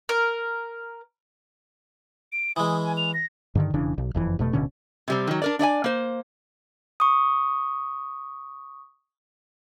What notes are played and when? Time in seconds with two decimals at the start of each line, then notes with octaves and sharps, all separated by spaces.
0.09 A#4
2.32 D7
2.56 E3 G#3 D#6
2.83 G#5
2.97 F7
3.14 A#6
3.55 G2 D3 D#3
3.74 E1 C#3 E3 D4
3.98 B1
4.14 F#1 F2 E3
4.39 F1 B2 A3
4.53 D1 B2 D3 C#4
5.08 C3 G3 C4
5.27 D#3 F#3
5.42 D4 A#4 D5
5.59 D4 D5 D#5 G#5
5.84 A#3 C5
7.00 C#6 D#6